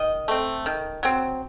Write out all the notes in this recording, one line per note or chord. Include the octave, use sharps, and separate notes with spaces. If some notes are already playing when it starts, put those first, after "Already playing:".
Already playing: D#3 D#5
A3 C4
D#3
F#3 C4